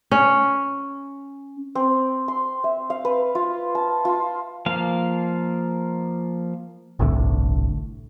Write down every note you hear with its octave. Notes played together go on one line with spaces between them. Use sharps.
C#4
C4
C6
E5
F5
B4
F4
A5
F4
F3 A#3 F5
G1 C2 A2 D3